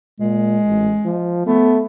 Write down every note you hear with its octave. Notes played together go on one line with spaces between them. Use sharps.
A#2 G#3
A1
F3
A3 B3